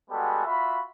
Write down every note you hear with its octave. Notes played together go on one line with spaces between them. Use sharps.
G3 G#3 B3 F#4 A4 G#5
F4 F#4 E5 B5